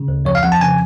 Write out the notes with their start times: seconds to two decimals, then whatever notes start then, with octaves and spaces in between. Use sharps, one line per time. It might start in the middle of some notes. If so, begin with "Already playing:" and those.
Already playing: C#3
0.08 D2
0.25 F2 C#5
0.35 F5
0.43 F2 F#5
0.52 A5
0.61 C#3 G#5